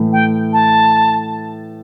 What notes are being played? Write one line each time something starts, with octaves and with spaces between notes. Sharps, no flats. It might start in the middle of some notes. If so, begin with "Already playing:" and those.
Already playing: A2 E3 A3
G5
A5